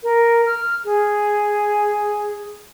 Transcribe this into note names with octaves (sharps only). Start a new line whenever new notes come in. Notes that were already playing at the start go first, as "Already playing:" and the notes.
A#4
F6
G#4